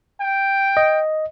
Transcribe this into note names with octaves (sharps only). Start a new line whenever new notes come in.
G5
D#5